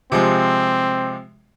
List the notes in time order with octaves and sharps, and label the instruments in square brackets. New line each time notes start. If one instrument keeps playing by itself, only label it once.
[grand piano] C3 F3 G#3 [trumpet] C4